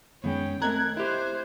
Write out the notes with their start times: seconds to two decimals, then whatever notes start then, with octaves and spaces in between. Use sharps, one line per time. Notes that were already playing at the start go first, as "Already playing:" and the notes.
0.24 F#2 D#3 G#3 B3 C#4 G5
0.62 A3 C4 A#4 D#5 A#5 F#6 G#6
0.97 E4 G4 C5